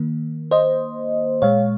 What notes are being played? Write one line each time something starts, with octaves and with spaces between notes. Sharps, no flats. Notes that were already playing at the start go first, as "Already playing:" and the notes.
Already playing: D#3 A#3
C5 D#5
A#2 G#3 C#5 F5